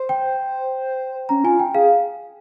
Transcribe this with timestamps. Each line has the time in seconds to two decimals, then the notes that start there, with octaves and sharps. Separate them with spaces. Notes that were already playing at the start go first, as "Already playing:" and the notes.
Already playing: C5
0.09 G5
1.29 C#4 A#5
1.44 F4 G#5
1.59 G5
1.74 G#4 F5